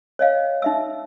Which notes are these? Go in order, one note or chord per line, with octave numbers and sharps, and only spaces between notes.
C#5 D#5 F5
D#4 E5 E6